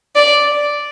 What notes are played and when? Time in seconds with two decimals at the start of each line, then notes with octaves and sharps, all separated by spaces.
0.15 D5